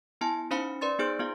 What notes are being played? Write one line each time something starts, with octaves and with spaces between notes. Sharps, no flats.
B3 E4 G#5 A5
C#4 D#4 C5 F5 B5 C#7
B4 D5 C6 A6
B3 D#4 G#4 C5 G6 D7
B3 F4 G#4 F5